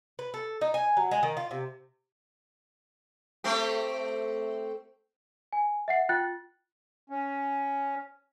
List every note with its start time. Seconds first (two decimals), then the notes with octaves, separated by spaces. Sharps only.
0.19 B4
0.34 A4
0.61 D#4
0.74 G#5
0.97 F#3
1.11 G#3
1.23 D#3
1.37 F4
1.51 C3
3.44 A3 C4 G4
5.53 G#5
5.88 E5 F#5 C7
6.09 F4 G5 F#6 A6
7.10 C#4